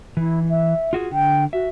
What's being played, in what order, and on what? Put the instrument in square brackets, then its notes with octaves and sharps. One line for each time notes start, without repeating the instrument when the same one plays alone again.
[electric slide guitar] E3 [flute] E4
[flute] E5
[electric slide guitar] F4 F#4 G#4
[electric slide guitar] D3 [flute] G5
[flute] F#4 [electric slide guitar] E5